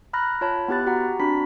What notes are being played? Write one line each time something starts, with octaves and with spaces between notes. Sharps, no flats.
A#5 B5 F6 F#6 A#6
F4 C#5 A5 B5
B3 E4 G4 F#6 A6
F#4 G4 F#5 A#5
C4 D4 F#4 A#5 B5 B6